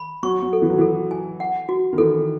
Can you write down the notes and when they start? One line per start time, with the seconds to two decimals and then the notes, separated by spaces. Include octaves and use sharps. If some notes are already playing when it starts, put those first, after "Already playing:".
Already playing: B5
0.23 F#3 C#6
0.42 F#3
0.53 A4
0.62 E3
0.70 F#3
0.78 E3 A4
1.11 G#5
1.40 F#5
1.69 F#4
1.93 D#3
1.98 E3 A4